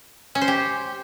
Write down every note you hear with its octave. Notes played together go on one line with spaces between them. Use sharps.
C#4
C5
G4